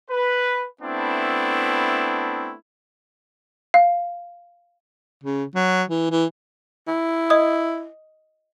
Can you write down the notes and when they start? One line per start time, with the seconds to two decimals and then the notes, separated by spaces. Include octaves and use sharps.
0.11 B4
0.82 A3 B3 C4 D4 E4
3.74 F5
5.24 C#3
5.55 F#3
5.90 E3
6.11 E3
6.88 E4
7.30 D#5 D#6